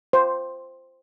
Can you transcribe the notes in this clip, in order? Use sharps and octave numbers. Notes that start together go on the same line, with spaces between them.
C5